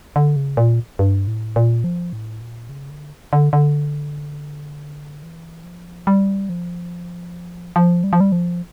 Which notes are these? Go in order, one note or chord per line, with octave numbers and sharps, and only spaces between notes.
D3
C#3
A#2
G2
A2
A#2
F3
A2
A#2
C#3
D3
D3
D3
E3
F3
G3
F3
F3
G3
F3
G3
F3